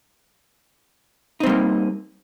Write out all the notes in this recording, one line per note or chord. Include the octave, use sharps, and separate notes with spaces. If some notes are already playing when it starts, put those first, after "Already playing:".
G3 A#3 C4 D#4